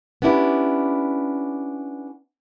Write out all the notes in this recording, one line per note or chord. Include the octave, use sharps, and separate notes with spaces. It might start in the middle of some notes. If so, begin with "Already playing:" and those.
B3 C#4 D4 E4 G4